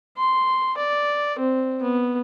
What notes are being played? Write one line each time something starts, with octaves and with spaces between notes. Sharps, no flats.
C6
D5
C4
B3